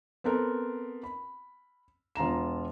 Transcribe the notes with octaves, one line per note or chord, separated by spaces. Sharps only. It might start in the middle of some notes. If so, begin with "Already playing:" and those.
B3 C4 A4 A#4
B5
E1 F4 A#5 E7